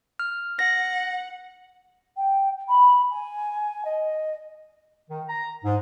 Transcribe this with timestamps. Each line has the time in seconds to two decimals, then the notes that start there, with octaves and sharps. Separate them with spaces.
0.19 F6
0.59 F#5 A#6
2.16 G5
2.68 B5
3.10 G#5
3.84 D#5
5.10 D#3
5.29 A#5
5.64 G#2